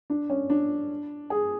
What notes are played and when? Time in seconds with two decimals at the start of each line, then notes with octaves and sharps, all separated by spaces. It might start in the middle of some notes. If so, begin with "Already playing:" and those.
0.10 D4
0.30 C#4
0.50 D4
1.30 G#4